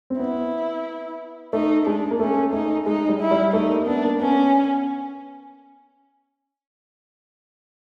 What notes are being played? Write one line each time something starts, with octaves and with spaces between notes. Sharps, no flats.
C4
B3 E4
A3 D#4
G#3 D4
A#3
A3 C#4
A3 D#4
G#3 D#4
G3
E4
G3
A3 D#4
A#3
B3 D4
A#3
B3 C#4